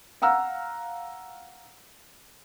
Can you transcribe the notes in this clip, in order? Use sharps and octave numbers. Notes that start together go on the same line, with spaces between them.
F5 F#5 A#5 E6 F6